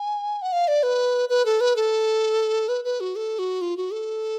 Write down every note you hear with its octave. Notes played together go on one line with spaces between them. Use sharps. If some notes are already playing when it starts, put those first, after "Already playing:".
Already playing: G#5
F#5
F5
D5
B4
B4
A4
B4
A4
B4
B4
F#4
A4
F#4
F4
F#4
A4